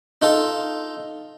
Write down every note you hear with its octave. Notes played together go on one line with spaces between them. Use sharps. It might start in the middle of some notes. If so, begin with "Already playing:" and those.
D#4 F4 A4